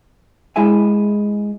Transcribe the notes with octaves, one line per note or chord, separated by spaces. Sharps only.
G#3 E4 G#4 E5 G#5